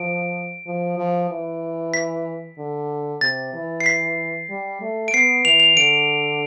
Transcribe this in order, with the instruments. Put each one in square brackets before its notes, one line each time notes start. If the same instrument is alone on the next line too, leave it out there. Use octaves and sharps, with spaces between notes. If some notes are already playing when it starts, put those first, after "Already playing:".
Already playing: [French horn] F3 [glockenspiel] D7
[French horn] F3
F3
E3
[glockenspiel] B6
[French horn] D3
[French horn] C3 [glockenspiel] A6
[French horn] E3
[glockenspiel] C7
B6
[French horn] G3
A3
[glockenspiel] D7
[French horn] B3 [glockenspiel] C7
[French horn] E3 [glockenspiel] F7
[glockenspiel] F7
[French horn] D3 [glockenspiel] D7